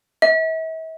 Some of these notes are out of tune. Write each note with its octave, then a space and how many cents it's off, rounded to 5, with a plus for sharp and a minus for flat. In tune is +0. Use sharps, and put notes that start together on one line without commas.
E5 -40